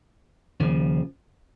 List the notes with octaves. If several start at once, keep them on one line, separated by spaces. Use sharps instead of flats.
D#2 C#3 F3